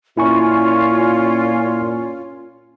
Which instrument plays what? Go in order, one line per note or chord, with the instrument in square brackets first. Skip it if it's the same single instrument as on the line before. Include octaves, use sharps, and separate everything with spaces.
[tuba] A#2 [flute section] C#4 F4 [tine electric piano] E4 G#5 C#6